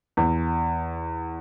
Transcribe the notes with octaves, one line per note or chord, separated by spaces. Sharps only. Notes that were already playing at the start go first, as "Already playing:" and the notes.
E2